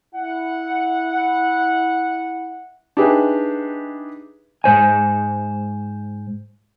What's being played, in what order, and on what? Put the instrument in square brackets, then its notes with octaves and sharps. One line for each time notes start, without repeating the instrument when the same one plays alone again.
[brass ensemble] E4 F#5
[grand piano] D4 D#4 G4 G#4 B4 E5
[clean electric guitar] G#2 C5 G#5